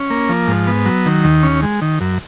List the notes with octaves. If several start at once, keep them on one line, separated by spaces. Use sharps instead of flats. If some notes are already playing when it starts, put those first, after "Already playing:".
Already playing: C#4
A#3
F3
G#2
B3
F#3
D#3
D#2
C#4
G#3
D#3
F#2